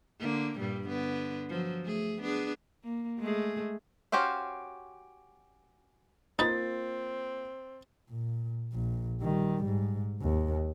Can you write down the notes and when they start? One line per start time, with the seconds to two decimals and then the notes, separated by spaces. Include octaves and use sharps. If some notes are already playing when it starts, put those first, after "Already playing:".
0.20 D3 A#3
0.59 G2 A#2 G3
0.89 D3 B3
1.49 F3 F#3
1.84 A3 G#4
2.21 B3 D4 G#4
2.84 A#3
3.20 G#3 A3 G#4
4.12 C#4 F#4 G4 C5 F5
6.39 A#3 C4 D#4 F4 B4 A6
8.10 A#2
8.72 A#1 A#2
9.21 D#3 G3
9.65 G#2
10.22 D#2